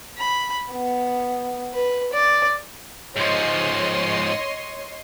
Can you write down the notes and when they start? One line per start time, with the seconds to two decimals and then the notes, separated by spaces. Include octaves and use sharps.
0.17 B5
0.72 B3
1.73 B4
2.13 D5
3.16 G#2 F3 C#5 D#5 C6